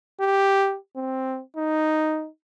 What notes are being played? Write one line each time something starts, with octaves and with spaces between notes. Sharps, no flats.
G4
C4
D#4